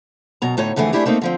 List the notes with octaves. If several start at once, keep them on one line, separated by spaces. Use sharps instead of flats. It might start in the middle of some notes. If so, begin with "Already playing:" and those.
F#2 B2 A#5
D2 A2 D#4 C#5
F2 D3 E3 A3 G#4
A3 C4 D4 E4 G4 G#4
A3 A#3 C4 D#4
D3 F3 C4